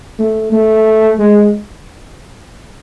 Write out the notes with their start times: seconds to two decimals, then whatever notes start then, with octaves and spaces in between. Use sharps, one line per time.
0.19 A3
0.52 A3
1.19 G#3